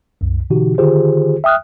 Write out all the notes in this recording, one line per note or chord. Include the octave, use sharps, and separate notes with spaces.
C2 F#2
B2 D3 E3 D#4 F#4 G4
D3 D#3 F4 G4 G#4 C5
E5 G5 D#6 F6 F#6